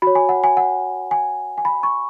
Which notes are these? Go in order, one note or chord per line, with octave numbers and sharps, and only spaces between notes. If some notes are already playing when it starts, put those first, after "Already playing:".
F#4 C#5 B5
G#5
F#5
G#5
F#5
G#5
G#5
B5
C#6